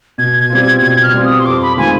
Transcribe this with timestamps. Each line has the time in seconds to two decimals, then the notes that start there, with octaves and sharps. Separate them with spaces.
0.18 B2 G#6
0.40 G#6
0.50 G3 C4 F4
0.62 G#6
0.82 B2 G#6
1.03 F6
1.13 G3 C4 F4
1.24 D#6
1.39 C6
1.46 F2 D6
1.62 B5
1.77 D#3 G#3 C4 F4 G#5